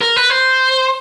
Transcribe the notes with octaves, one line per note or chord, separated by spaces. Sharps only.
A#4
B4
C5